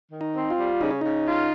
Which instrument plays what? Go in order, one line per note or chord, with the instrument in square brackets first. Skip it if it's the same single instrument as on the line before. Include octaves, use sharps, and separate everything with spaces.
[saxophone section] D#3
[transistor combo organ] D#4
[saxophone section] C4
[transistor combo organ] F4
[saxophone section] G3
[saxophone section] C#3 [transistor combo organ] D#4
[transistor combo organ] C#4
[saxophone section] C#3 [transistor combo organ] D#4
[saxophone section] F4